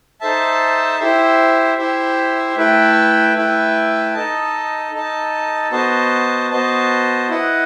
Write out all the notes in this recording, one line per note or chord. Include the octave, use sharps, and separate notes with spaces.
D#4 A4 C5 E5 A5
E4 G4 C5 E5
E4 G4 C5 E5
A3 E4 B4 E5 G5
A3 E4 B4 E5 G5
D#4 A4 D#5 A5
D#4 A4 D#5 A5
B3 F#4 C5 D#5 A5
B3 F#4 C5 D#5 A5
E4 B4 D#5 F#5